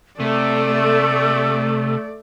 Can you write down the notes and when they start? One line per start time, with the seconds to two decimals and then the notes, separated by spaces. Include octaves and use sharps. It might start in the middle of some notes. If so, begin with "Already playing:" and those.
0.20 C3 A3 A4 D5